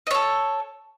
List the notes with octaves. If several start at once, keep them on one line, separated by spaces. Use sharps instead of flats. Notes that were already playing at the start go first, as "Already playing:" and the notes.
A4 C#5 D#5